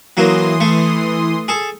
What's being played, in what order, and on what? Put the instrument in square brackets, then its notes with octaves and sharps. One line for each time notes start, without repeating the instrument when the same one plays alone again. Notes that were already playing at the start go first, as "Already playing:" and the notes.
[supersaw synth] E3 C6 D#6 [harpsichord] F#3 A#3
[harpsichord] A3
G#4 A4